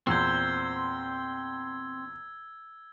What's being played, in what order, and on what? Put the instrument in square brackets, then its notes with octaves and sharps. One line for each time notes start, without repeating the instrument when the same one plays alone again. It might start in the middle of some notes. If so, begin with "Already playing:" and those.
[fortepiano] E2 A#2 [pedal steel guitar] C4 C5 [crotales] E6 G#6